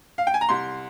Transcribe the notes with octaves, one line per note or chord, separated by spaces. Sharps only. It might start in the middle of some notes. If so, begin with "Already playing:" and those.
F5
G5
G#5
A#5
C2 C6